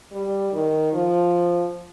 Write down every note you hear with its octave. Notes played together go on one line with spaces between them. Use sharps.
G3
D#3
F3